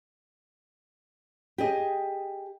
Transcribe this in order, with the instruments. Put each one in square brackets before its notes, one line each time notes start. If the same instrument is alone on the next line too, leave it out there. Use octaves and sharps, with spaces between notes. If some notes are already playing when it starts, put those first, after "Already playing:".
[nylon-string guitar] G4 G#4 D#5